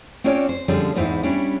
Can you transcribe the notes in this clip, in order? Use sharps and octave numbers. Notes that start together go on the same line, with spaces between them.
C4 C#4 F4 C#5 D5
C5
D3 F3 G3 G#3 C4 C#4
E2 G#2 C4 D#4 E4
G3 C#4 D4 E4